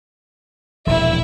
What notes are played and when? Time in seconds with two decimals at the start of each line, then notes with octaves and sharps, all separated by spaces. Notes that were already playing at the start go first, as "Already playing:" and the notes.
0.87 E1 A#1 E4 E5